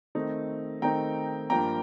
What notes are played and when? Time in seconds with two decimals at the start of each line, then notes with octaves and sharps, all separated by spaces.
0.15 D#3 A3 C4 D#4
0.82 D#3 A3 C4 D#4 G5 A#5
1.50 G2 F3 A#3 G5 A#5